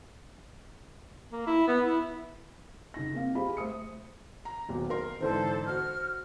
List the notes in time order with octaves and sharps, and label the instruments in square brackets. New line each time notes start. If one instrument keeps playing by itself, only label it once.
[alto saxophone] A#3
E4
B3
E4
[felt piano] C#3 D#4 A#6
A#3 C4 F5
G4 G#4 C5 F5 B5
A3 C5 D#6 C#7
A#5
D#1 B2 F#3
A#4 C6
[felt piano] G#2 D3 E3 [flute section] A4 C5
[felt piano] F#4 C5 [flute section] F6